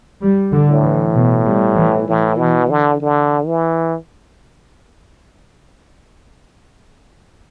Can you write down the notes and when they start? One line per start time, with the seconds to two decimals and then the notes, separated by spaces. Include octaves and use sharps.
0.21 G3
0.53 D3
0.69 A2
0.84 E3
1.15 B2
1.46 G3
1.76 E3
2.07 A2 E3
2.39 B2
2.70 D3
3.01 D3
3.47 E3